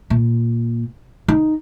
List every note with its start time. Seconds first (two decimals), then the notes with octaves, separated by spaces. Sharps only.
0.10 A#2
1.28 D#4